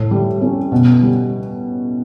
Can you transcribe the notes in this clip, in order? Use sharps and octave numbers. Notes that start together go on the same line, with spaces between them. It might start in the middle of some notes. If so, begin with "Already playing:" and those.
Already playing: A2
G3
C#4
B2
G3